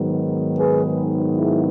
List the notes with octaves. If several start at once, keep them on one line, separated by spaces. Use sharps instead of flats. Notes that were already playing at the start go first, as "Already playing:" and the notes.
Already playing: G#2 D#3 F#3 B3
G#4 B4
E4 G#4